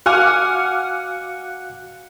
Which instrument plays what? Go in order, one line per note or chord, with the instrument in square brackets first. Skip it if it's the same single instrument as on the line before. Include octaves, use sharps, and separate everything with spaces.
[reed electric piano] F#4 F5 [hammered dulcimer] F#5 [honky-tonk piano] G#5 D6 F6